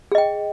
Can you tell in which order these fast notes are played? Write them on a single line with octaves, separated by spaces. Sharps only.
G#4 D#5 G5